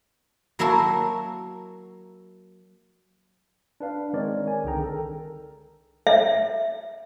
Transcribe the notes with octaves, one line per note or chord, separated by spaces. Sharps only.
F#3 A#3 E4 F#4 A4
D4 B4 F5
D#3 G#3 C4 A#4 C#5 D5
G#5
C2 D3 D#3 G#4 G5 A#5
A4 A#4
E5